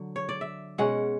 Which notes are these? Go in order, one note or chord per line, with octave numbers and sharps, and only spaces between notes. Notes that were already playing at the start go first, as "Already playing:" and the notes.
Already playing: D3 F#3
C#5
D5
E5
B2 G#3 C#4 F#5